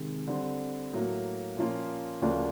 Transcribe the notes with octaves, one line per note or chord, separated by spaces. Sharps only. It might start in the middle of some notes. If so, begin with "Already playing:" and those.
Already playing: C3 D#3 G#3
D3 G3 C4
A2 F#3 A#3
A#2 F3 A#3 C#4 F4
D2 C#3 F3 A#3 D4